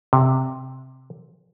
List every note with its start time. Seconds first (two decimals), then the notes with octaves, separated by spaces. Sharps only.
0.13 C3